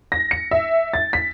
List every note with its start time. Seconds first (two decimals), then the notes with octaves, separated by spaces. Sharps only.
0.12 A#6
0.31 C#7
0.51 E5
0.94 A6
1.13 B6